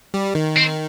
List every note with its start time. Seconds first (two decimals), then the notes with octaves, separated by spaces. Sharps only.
0.14 G3
0.35 D#3
0.56 C4